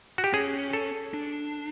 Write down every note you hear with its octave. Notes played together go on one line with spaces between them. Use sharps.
F#4
G4
C#4 G#4
A4
D4